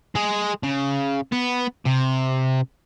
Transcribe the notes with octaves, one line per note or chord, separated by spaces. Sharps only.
G#3 G#4
C#3
B3
C3